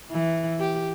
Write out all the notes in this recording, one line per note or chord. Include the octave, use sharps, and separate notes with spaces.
E3
G4